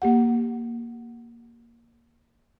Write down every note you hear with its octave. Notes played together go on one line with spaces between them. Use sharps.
A#3 G4 F#5